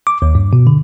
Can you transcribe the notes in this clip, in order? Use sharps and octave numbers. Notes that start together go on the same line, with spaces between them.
D6
D#2
G2
B2
D3